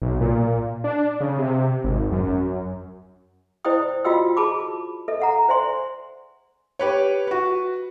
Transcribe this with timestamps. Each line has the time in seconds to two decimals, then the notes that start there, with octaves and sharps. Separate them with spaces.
0.02 B1
0.21 A#2
0.84 D4
1.20 C#3
1.38 C3
1.84 G#1
2.12 F#2
3.65 E4 C5 D5 D#5 G5 D#6
4.05 F4 F#4 D#5 G5 E6
4.37 G#4 A5 B5 D6
5.08 A4 D#5 E5
5.20 E5 F#5 A#5
5.48 C5 D5 E5 G#5 C6
6.79 G4 B4 C#5
7.27 F#4 B4